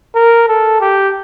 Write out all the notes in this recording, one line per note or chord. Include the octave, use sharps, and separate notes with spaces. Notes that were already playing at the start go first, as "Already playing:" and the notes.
A#4
A4
G4